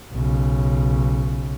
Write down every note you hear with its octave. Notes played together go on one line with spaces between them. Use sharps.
B1 C#3